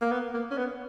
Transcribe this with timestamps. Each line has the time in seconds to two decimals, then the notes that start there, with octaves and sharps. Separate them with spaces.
0.01 A#3
0.12 B3
0.34 A#3
0.51 C#4
0.57 B3